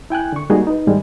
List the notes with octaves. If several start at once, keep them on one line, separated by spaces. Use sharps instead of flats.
E4 G5 G#5 F#6
D3 C#6
G3 G#3 A#3 D#4 F#4 G#4
D#4 B4
G#2 D#3 G3 G#3